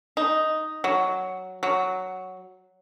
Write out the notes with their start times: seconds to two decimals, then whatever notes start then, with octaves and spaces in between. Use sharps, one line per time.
0.17 D#4
0.84 F#3
1.63 F#3